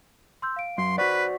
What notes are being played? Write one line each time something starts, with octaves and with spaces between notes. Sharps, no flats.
C6 E6 G6
F5 D7
F#2 C6
F#4 B4 C5 D5 F#5 C#6 B6